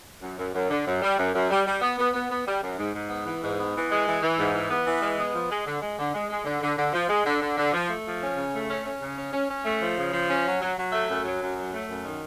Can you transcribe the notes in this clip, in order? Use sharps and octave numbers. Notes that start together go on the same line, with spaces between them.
F#2
F#2
F#2
D3
F#2
G3
F#2
F#2
G3
G3
B3
B3
B3
B3
G3
F#2
G#2
G#2
B3
E3
G#2
B3
E3
G#3
E3
E3
G#2
E3
B3
E3
G#3
B3
F3
G#3
D3
G#3
D3
G#3
G#3
D3
D3
D3
F3
G#3
D3
D3
D3
F3
A3
F3
C#4
C#3
A3
C#4
C#4
C#3
C#4
C#4
C#4
A3
F3
C#3
F3
C#4
F#3
F#3
F#3
A3
F#2
F#3
F#2
F#3
A3
F#2
D#3